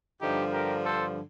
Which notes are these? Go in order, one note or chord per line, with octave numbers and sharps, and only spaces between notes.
G2 D3 F3 D#4 G4
G4 A#4
A4 C5